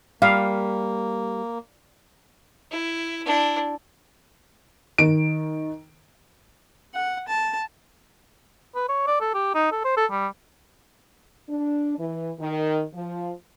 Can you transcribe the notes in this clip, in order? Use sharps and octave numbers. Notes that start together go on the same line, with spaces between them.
G3 A#3 F5
E4
D4 E4
D#3 D7
F#5
A5
B4
C#5
D5
A4
G4
D#4
A4
C5
A4
G3
D4
E3
D#3
F3